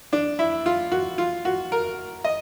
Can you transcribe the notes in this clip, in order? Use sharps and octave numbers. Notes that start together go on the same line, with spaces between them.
D4
E4
F4
F#4
F4
F#4
A#4
D#5